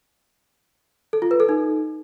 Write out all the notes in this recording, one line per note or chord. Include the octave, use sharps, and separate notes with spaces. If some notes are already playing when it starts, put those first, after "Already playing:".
A4
F4
B4
A4
D#4